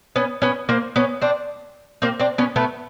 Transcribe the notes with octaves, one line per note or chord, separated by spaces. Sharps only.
B3 C#4
B3 C#4
A#3 C4
B3 C#4
C4 D4
A#3 C4
C4 D4
B3 C#4
A3 B3